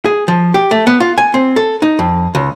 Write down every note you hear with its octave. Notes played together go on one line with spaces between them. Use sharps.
G#4
F3
G4
A3
B3
F4
G#5
C4
A4
D#4
F2
C#2